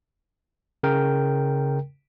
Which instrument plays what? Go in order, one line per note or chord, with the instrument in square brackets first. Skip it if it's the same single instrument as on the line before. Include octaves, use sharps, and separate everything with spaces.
[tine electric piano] C#3 A#4 G5